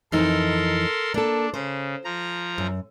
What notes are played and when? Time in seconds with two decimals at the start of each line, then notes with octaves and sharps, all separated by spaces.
0.12 F2 E3 D#4 A4 A#4 C6
1.14 A#3 D4 A4
1.54 C#3 C5
2.05 F3 A#5
2.58 F#2